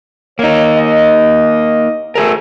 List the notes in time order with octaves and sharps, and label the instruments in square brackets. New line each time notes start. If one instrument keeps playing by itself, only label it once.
[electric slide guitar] A#3 D#4 [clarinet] C#5
[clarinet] D#5
[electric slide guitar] A3 G#4 A#4